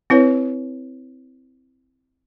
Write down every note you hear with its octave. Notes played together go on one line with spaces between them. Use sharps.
C4 E4 B4 C#5